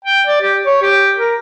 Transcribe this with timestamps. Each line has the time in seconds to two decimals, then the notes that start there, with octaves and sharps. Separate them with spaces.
0.05 G5
0.27 D5
0.42 G4
0.66 C#5
0.82 G4
1.17 A#4